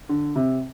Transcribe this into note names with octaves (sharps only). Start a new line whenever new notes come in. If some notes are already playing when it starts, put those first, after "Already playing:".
D3
C3